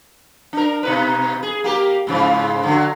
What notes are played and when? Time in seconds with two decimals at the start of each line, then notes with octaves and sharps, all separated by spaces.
0.53 D4 A#4
0.83 B2 D#4 B4
1.43 G#4
1.64 A#3 G4 A#4
2.07 G#2 C#3 F3
2.63 D3 F#3